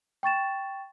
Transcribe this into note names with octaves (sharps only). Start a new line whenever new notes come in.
G5 C#6 A6 E7